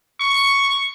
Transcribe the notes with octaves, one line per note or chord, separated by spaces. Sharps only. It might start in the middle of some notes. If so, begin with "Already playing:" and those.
C#6